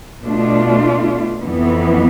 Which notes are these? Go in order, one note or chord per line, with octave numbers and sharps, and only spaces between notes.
B2 A3 D4 F4
F2 E3 B3